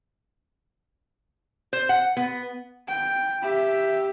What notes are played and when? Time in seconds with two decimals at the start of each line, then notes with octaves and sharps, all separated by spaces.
1.73 C5
1.89 F#5
2.17 B3
2.88 G5
3.42 G4 E5